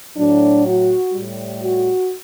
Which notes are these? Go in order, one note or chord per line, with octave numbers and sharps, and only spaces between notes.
A2 F#3 D4
F#4
A2 G3
F#4